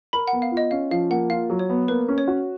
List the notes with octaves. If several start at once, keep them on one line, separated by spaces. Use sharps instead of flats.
A#4 B5
F#5
B3
F5
F4
D#5
C#4 F5
F3 F5
A#3 F#5
F4 F5
F#3
C#5
B3
A#3 B4
C#4
C#5
F#4